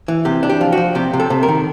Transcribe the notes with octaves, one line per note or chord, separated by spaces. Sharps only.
E3
C3 G4
D4
G4
F3
F3 F#4
C3 G4
C3
A4
C3
A#4
D#3